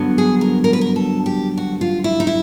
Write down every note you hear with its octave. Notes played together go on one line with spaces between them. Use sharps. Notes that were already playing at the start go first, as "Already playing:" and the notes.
Already playing: G2 D3 F#3 B3
G#4
A#4
A#4
B4
A#4
A4
G4
F#4
F4
E4
D#4
E4